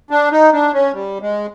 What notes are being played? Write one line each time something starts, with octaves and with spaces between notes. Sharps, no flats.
D4
D#4
D4
C#4
G3
G#3